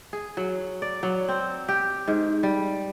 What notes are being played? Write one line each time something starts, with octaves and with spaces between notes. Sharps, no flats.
G#4
F#3
D5
F#3
C4
G4
G#2
G3